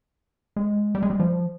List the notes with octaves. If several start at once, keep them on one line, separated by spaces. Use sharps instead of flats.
G#3
G3
G#3
G3
F3